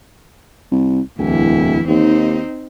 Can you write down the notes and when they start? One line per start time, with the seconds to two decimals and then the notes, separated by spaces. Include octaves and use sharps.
0.71 C2
1.18 D1 E2 E4
1.88 D#2 C4 D#4